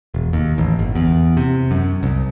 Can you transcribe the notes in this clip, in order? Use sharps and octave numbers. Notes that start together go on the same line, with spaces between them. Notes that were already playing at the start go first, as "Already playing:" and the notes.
E1
D#2
A1
G1
E2
C3
F#2
C2